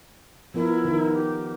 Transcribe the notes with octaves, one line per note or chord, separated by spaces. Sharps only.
F3 B3 E4 A#4
D#3 A#4
G4